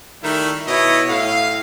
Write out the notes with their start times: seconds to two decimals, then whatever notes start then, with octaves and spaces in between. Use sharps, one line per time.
0.22 D#3 G3 A3 E4
0.68 B2 E4 C#5 D#5
1.09 A2 F5